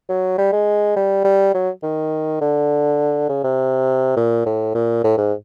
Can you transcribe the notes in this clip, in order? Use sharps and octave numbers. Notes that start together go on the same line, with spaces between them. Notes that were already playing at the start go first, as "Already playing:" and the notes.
F#3
G3
G#3
G3
G3
F#3
D#3
D3
C#3
C3
A#2
A2
A#2
A2
G#2